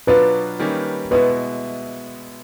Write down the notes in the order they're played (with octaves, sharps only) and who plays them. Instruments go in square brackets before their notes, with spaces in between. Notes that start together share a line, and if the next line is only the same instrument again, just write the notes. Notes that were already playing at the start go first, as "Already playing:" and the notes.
[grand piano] B2 F#3 B3 D4 F4 [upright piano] B4
[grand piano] D#3 G3 A#3 C#4
[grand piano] B2 G#3 B3 E4 [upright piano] B4